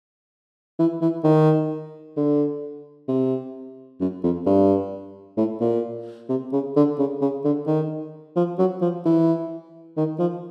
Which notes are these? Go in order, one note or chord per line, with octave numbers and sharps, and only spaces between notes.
E3
E3
D#3
D3
C3
F#2
F2
G2
A2
A#2
C3
C#3
D3
C#3
C#3
D3
D#3
F3
F#3
F3
E3
D#3
F3